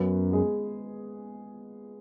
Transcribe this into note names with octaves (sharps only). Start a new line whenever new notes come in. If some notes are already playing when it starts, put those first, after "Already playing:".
Already playing: F#2 B3 B4
G#3 G#4